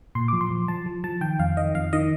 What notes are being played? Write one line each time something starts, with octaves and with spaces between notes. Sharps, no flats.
A#2 C6
F3 D6
C6
F3
F3 A5
F3
F3 A5
D#3 G5
F2 F5
D#3 D#5
F2 F5
D#3 D#5